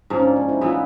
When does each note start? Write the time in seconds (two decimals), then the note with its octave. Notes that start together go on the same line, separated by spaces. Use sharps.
0.10 G#2 F3 A#3 C#4
0.22 D4
0.36 D#4
0.49 E4
0.61 E3 G#3 B3 E4 F4